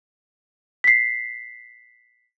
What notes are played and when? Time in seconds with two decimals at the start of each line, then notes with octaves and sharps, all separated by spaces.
0.84 B6 C7